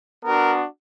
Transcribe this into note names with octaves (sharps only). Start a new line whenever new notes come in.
B3 D4 F#4 A#4